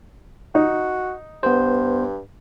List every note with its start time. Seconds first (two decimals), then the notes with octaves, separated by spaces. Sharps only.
0.55 D#4 F#4
1.43 G2 B3 C5